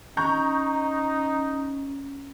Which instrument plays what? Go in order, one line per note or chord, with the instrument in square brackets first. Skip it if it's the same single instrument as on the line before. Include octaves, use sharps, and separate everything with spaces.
[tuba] C#4 [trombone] D#4 [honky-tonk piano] A#5 C#6 G6